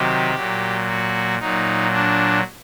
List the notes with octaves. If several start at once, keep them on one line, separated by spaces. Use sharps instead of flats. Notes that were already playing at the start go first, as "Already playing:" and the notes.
Already playing: C3 D#3 F#3 G4
A#2 F#3
F#4
A#2 F#3 D#4
D4